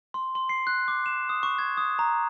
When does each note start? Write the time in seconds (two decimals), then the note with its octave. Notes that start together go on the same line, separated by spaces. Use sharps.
0.14 C6
0.35 C6
0.49 C7
0.67 F#6
0.88 D6
1.06 E7
1.29 D#6
1.43 C#6
1.59 G#6
1.77 D#6
1.99 A#5